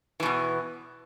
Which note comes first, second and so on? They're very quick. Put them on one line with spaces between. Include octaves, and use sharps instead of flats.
E3 B2 E2